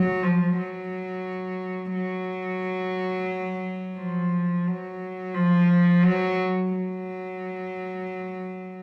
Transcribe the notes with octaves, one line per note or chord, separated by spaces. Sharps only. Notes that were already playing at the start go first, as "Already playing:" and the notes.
Already playing: F#3
F3
F#3
F#3
F3
F#3
F3
F#3
F#3